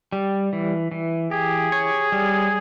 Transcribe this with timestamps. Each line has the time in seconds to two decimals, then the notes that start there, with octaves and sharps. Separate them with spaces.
0.12 G3
0.53 E3
0.92 E3
1.31 G4 G#4
1.72 C#5
2.12 G3